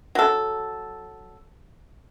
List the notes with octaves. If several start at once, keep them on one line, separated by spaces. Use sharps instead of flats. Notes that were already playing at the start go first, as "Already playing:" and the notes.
F#3 A4